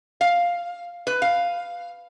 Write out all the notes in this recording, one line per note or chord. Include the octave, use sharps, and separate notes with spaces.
F5
B4
F5